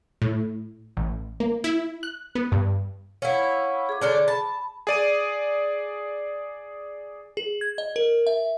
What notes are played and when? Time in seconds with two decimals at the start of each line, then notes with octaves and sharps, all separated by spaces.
0.22 A2
0.97 A1
1.40 A#3
1.64 E4
2.03 F#6
2.35 B3
2.52 G2
3.22 C#4 E4 F5 F#5
3.89 G#4 D6
4.01 D3 C#4 D4
4.28 A5 B5
4.87 G#4 D5 D#7
7.37 G#4
7.61 G#6
7.78 D#5
7.96 A#4
8.27 E5